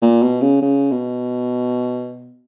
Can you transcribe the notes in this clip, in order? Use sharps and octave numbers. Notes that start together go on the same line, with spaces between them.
A#2
B2
C#3
C#3
B2